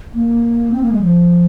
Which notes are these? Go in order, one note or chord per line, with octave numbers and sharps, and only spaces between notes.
A#3
C4
A#3
G#3
F3